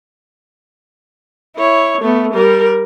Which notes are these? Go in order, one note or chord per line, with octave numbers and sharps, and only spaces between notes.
E4 C#5
A3 B3
G3 A#4